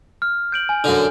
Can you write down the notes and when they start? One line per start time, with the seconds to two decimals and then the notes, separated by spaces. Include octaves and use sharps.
0.22 F6
0.52 G6 D7 F#7
0.69 G#5
0.84 F#2 D3